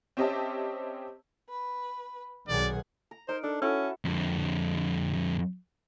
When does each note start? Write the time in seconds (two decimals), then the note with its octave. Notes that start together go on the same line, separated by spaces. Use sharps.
0.17 C4 C#4 G4 D#5 E5 A5
1.49 B4
2.48 B1 D#3 G#4 D5 F#5 G#5
3.11 A#5
3.29 D#4 A#4 C5
3.44 D4 A4
3.62 C#4 E4 F#4 A4
4.05 F2 D3